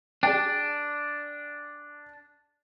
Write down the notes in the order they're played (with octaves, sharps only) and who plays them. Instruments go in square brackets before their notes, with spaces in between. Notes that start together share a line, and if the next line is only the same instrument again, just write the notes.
[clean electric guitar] D4 [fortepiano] G#4 D5 G5